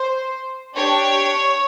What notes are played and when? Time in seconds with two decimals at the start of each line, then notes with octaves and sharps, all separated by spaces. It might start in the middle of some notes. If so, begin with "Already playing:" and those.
Already playing: C5
0.76 D4 G4 C#5